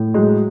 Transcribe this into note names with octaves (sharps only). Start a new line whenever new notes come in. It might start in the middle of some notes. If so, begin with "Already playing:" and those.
Already playing: A2
F#3 G#3